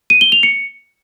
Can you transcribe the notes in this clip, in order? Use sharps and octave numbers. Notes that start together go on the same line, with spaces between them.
D#7
G7
F7
C#7